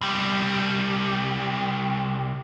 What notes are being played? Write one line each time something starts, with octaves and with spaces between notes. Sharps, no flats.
C2 G3